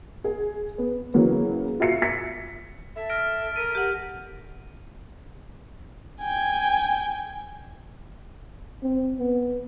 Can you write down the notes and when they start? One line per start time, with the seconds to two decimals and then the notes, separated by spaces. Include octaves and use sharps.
0.24 G#4
0.78 B3
1.14 C#3 E3 F#3 A#3 B3
1.80 F4 F#4 E5 C7 C#7
2.02 B6 C#7
2.96 A4 E5
3.10 F6 A#6 D7
3.56 A#4 B6 D#7
3.75 G4 F#5
6.22 G5 G#5
8.83 C4
9.20 B3